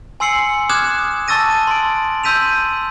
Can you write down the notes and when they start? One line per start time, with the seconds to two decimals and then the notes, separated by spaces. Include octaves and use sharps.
0.20 G#5 C6 E6 C7 C#7 F#7
0.69 D6 D#6 F6 F#6 G#6 E7
1.28 A5 C#6 E6 A6 A#6 D#7
1.67 C6 D7
2.24 C6 E6 G6 B6 D#7 F7